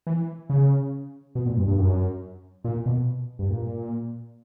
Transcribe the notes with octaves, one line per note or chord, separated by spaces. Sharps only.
E3
C#3
B2
A#2
G2
G2
F#2
A#2
B2
G2
A#2